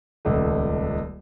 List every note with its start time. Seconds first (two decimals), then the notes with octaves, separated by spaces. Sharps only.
0.25 D#1 C#2 A3